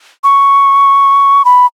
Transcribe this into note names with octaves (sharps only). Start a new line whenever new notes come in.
C#6
B5